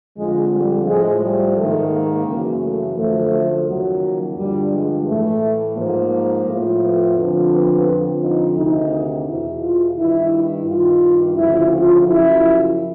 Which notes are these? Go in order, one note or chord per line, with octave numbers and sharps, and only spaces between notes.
F2 D3 F3 G#3
G3
A2 F3 G#3
G3
G#2 D#3 A3
A#3
F#2 C#3 E3
A3
F#2 D3 F3 A3
D#2 C#3 F3 F#3
G2 D3 F3 G3
G#3
A2 E3 A3
G#2 F3 A#3
A2 F3
B3
F2 D3 F3
B3
F2 D3 F3
D#4
D2 C3 D#3 D#4
E2 B2 E4
F4
G2 D#3 E4
E4
G2 D#3 F4
D2 C#3 F3 E4
F4
F#2 C#3 F3 E4